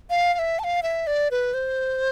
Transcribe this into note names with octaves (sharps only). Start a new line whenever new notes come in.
F5
F5
E5
A5
F5
E5
D5
B4
C5